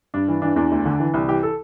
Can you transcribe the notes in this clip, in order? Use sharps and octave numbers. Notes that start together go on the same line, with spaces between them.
G2 D4
E3
E3 D4
E2 D4
D2
D3
E3
C2
E3 G4
A4